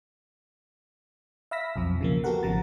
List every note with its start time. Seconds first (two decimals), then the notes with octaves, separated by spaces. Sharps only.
1.51 E5 F5 B5 E6 A#6 B6
1.76 B1 F2 F3
2.01 C#3 F3 A#3
2.24 B3 F#4 G4 A4 A#4 F#5
2.43 G#1 C#3 F3 A#5 A6